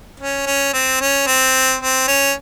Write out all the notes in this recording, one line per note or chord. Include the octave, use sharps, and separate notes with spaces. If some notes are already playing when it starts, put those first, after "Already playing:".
C#4
C#4
C4
C#4
C4
C4
C#4